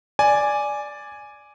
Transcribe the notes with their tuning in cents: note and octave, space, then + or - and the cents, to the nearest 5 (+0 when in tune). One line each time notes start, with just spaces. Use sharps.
D5 +0 G#5 +0